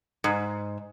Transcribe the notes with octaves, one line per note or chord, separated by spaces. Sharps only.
G#2